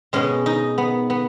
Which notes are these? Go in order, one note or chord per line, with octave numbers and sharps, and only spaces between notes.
B2 G#3 C#4
D#4
B3
B3